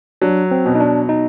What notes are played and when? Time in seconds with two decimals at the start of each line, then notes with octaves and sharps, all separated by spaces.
0.21 F#3 D4
0.51 C4
0.65 B2
0.75 D#4
0.80 D4
1.09 D#4